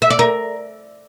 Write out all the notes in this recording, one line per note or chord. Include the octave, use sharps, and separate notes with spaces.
E5
D5
A#4